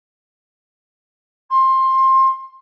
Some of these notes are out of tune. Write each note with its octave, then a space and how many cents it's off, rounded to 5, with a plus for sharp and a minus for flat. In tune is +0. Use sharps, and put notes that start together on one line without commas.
C6 +20